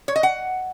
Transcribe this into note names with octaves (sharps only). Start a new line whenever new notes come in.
C#5
D#5
F#5